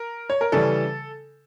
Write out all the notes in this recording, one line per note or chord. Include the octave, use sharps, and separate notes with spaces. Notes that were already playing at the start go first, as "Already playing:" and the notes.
Already playing: A#4
C#5
A#4
C#3 E3 G3 A4